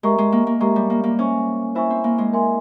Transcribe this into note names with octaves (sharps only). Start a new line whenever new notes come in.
G#3 G4 A#4 E5 A#5 C#6
G#3
A#3
A#3
G#3 G4 A#4 E5 A#5 C#6
G3
A#3
A#3
C#4 C5 E5 G#5 C#6
E4 C5 E5 G#5 C#6
C4
A#3
G#3
A#4 E5 G#5 C6